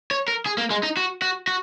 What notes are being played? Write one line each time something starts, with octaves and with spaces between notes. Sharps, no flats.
C#5
A#4
G#4
A#3
G#3
D#4
F#4
F#4
F#4